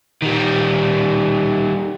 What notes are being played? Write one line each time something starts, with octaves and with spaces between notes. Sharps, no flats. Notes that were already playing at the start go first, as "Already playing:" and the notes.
D#3 G3